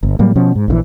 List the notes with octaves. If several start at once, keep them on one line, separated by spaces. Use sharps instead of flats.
G1
A2 F#3 G3 A#3
B2 F3 C#4
G#2
A#1 C#3 E3